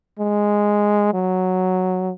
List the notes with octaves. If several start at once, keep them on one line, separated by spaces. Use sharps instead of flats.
G#3
F#3